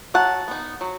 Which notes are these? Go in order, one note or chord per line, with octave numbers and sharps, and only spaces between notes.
F#3 F#5 A5
B3 D#4
F#3